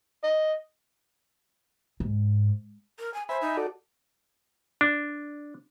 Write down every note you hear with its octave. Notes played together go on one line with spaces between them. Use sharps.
D#5
G#2
A#4
G#5
C5 E5 G#5 B5
D#4
F#4 A4 D5
D4